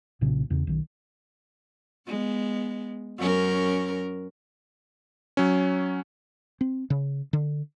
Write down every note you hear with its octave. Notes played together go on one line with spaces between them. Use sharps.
B1 A#2 C#3
E2 C#3
B1 D#3
G#3 B3
F#2 C#4 A#4
F#3 C#4
C4
C#3
D3